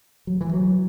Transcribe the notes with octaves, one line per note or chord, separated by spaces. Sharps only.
F#3
E3
F#3